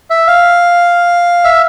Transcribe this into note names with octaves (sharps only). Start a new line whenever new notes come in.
E5
F5
E5